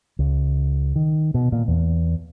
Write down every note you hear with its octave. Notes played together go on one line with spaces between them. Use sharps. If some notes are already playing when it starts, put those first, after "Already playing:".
C#2
D#3
B2
A#2
E2